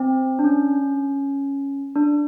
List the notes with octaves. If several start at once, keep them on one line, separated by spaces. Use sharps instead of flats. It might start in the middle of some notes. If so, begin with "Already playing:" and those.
Already playing: C4
D4
C#4
D4